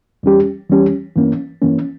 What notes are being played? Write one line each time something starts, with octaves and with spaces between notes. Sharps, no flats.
E2 E3 G3 C#4 G4
E2 E3 G3 C#4 G4
G2 E3 A#3 C#4
G2 E3 A#3 C#4